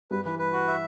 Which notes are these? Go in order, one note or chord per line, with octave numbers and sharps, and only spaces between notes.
G2 G3 B4
E3 B4
B4
F#4
E5